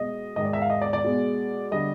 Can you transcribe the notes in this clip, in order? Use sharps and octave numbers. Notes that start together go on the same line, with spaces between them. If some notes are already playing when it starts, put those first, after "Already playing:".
Already playing: B2 G#3 D#5
G#2 D#3 G#3 D#5
D5
E5
F5
D#5
D5
D5
B2 G#3
D3 G3 D#5